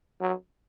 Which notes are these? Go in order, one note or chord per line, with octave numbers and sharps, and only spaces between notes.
F#3